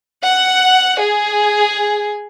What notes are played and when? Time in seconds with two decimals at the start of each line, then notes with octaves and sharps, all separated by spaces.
0.24 F#5
1.01 G#4